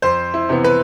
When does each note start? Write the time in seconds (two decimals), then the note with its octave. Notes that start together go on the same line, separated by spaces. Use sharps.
0.02 F2 C5
0.34 E4
0.49 C3 E3 B3
0.64 B4